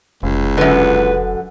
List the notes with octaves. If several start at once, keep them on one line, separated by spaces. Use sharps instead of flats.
F1 C#2
F#2 D3 B4